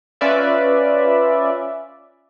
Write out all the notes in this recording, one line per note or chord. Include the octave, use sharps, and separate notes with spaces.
C#4 F4 B4 D5 E5